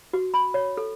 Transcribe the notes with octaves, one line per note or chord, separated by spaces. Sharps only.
F#4
B5
C#5
A4